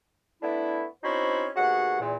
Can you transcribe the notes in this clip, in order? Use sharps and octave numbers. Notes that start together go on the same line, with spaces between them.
A3 B3 D4 E4
C4 C#4 D#4 E4 F#4 C5
D#2 B2 F#4 G#4 F#5
E2 A#2